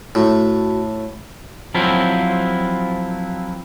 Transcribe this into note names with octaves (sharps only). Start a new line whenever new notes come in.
A2 F#4
F3 F#3 C4 E4 F4